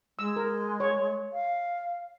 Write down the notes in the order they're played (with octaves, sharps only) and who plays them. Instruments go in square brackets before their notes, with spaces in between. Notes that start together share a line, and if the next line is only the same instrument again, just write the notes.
[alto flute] G#3 [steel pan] E6
[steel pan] A#4
C#5
[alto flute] F5